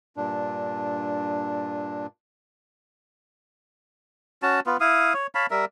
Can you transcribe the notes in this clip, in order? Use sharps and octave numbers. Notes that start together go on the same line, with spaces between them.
G2 A#2 D4
C#4 F#4 A5
B3 F4
E4 F5 D#6
C#5
C#5 F5 A5 B5
G3 A#4 E5